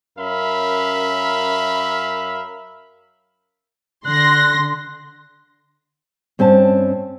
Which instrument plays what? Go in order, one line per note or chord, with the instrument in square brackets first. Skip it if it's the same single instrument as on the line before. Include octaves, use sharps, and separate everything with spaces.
[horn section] F#2 C#4 A#4 E5 F5 B5
[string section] D3 C6 A#6 [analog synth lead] F#6
[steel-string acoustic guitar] G2 C4 C#4 A5